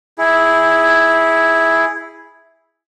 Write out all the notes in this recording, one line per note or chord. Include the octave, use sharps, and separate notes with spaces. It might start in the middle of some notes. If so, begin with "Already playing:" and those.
E4 G#4